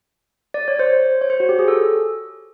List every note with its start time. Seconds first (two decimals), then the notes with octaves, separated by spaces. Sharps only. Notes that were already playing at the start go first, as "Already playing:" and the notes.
0.54 D5
0.68 C#5
0.79 C5
1.21 C#5
1.30 C5
1.40 F#4
1.49 G4
1.59 G#4
1.68 A4